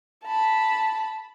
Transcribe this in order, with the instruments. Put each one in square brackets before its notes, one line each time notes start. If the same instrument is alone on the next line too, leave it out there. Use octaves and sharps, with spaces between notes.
[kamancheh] A5 B5